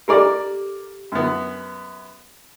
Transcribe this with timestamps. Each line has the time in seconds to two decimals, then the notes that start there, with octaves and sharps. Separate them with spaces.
0.08 A#3 G4 A4 A#4 D5
1.12 F#2 B3